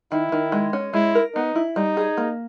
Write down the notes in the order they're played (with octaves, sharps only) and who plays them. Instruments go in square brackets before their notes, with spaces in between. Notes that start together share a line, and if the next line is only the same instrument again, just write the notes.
[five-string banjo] D#3 [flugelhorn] E4
[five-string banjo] D#3
G#3
C#4
[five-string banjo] G#3 [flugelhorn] E4
[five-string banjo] A#4
[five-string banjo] B3 [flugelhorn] D#4
[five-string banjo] E4
[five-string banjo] G3 [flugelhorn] D#4
[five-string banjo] G#4
A#3